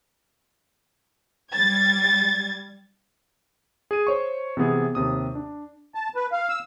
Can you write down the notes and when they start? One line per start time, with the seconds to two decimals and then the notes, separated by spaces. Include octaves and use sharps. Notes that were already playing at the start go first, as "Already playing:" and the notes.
1.55 G3 G#6 A6
3.91 G#4 D#7
4.07 C5 C#5 C#6
4.57 C3 E3 B3 G#4
4.95 D#2 C3 D#6
5.35 D4
5.95 A5
6.15 B4
6.32 F5
6.49 E6